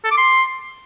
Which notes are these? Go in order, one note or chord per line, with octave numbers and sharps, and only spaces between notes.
A4
D6
C6